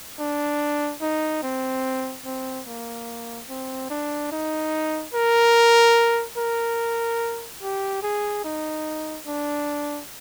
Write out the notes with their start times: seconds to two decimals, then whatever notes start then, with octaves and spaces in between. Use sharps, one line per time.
0.20 D4
1.02 D#4
1.43 C4
2.26 C4
2.67 A#3
3.50 C4
3.90 D4
4.32 D#4
5.14 A#4
6.38 A#4
7.63 G4
8.03 G#4
8.45 D#4
9.27 D4